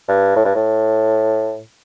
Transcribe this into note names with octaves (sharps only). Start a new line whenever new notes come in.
G2
A2
G2
A2